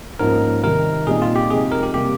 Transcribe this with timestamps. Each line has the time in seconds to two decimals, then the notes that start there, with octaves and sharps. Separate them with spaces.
0.19 G#2 F3 A#3 C#4 A#4
0.63 C3 D#3 G3 C4 D#4 A#4
1.07 A#2 G3 C4 D#4 G#4
1.22 F4
1.36 G4
1.50 F2 C3 F3 G#3 D#4 G#4
1.72 A#4
1.83 G4
1.94 C3 G3 A#3 G4